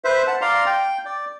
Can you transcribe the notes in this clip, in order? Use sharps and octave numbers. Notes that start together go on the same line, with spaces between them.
B4 C5 E5
F#5 A5
D5 F5 A#5 C6
G5
D5